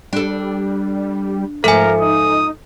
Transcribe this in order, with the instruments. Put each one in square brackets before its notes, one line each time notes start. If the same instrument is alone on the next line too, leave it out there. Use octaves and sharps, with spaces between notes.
[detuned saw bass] G3 [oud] D4 A4
[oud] G#2 F3 E5 [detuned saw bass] A3 [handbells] A4 G#5 [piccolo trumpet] A#4
[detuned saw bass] D#4 [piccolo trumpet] D#6